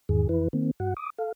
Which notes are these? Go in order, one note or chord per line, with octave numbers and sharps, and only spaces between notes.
E2 G#2 D#3 G#4
F2 E3 E4 B4
D#3 A#3 C4
G2 F#4 F#5
D6 D#6
A4 F5